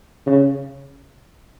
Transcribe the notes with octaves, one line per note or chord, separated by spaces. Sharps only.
C#3